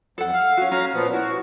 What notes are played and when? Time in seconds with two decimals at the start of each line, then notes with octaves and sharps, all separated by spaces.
0.18 F2 A4 F#5
0.33 F5
0.57 C#4 F#4
0.72 C#4 F5 A#5
0.93 A#2 F3 B3
1.13 E4 F#4